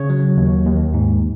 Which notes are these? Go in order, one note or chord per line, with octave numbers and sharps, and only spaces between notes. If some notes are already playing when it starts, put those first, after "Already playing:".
Already playing: C#3 C#5
F#3
D#2
D#2
G#2